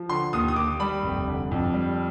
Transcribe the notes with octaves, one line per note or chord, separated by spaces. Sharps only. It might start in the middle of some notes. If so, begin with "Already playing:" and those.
Already playing: F3
D3 C6
D#2 D#6
D#6
D#2 D6
G3 B5
F1
D3
F2
G3